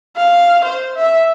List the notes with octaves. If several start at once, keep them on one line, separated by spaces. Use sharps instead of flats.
F5
C5
E5